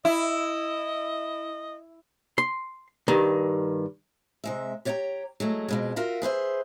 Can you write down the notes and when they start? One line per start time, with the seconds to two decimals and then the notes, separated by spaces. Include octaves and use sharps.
0.05 E4 D#5
2.38 C6
3.08 G2 D#3
4.44 C3 G#3 E5
4.85 G4 C#5 D5 F#5 G5 A#5
5.40 F#3 G#3 A3
5.68 F2 B2 G#3
5.96 F4 F#4 A#4 E5
6.22 G#4 B4 C5 E5